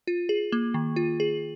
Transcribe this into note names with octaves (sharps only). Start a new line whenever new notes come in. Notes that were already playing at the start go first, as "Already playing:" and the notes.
F4
G#4
A#3
D#3
F4
G#4